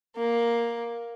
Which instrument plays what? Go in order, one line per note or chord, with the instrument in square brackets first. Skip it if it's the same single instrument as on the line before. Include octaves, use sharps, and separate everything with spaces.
[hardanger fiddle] A#3